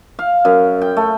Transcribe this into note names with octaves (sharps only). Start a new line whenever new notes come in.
F5
F#2
G5
A3